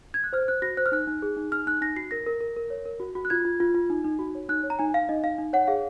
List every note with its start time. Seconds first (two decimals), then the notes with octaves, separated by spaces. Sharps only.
0.14 G#6
0.24 F#6
0.33 C5 F6
0.48 C5 F#6
0.62 F#4 A#6
0.77 C5 F#6
0.86 F6
0.92 D#4 F#6
1.07 D#4
1.22 G#4
1.37 D#4
1.52 D#4 F6
1.67 D#4 F#6
1.81 D#4 A#6
1.96 F#4 C7
2.11 A#4 A#6
2.26 A#4
2.41 A#4
2.56 A#4
2.70 C#5
2.86 A#4
3.00 F#4
3.15 F#4
3.25 F#6
3.30 F4 G#6
3.45 F4
3.60 F4
3.74 F4
3.90 D#4
4.05 D#4
4.19 F#4
4.35 C#5
4.49 D#4 F#6
4.63 C#5
4.70 A#5
4.79 D#4 G#5
4.94 D#4 F5
5.09 D#4 D#5
5.23 D#4 F5
5.38 D#4
5.53 C#5 F#5
5.67 G#4 F5